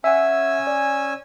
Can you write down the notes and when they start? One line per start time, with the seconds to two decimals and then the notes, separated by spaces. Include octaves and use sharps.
0.04 C#4 E5 F#5 G#5 E6
0.67 D5